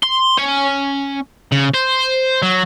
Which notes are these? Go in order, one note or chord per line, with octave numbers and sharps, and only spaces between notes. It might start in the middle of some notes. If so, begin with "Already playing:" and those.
C6
C#4
C#3
C5
F#3